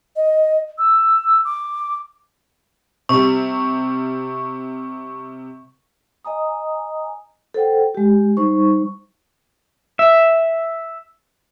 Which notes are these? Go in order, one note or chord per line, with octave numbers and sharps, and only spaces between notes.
D#5
E6
D6
C3 G3 C#6
D#5 G#5 A#5 D#6
A4 C5 F#5 G5
G#3 G4
G3 D#4 C5 C#6
E5